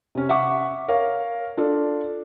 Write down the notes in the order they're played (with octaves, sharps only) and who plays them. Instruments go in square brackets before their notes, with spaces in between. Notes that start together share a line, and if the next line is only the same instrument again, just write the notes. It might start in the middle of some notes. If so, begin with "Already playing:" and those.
[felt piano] C3 C#4
E5 F#5 C#6 D6
A#4 C#5 F5
D4 F4 A4 D5